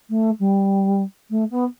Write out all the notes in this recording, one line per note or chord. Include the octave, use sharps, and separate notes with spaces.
A3
G3
A3
B3